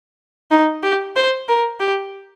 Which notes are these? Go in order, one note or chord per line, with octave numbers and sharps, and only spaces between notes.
D#4
G4
C5
A#4
G4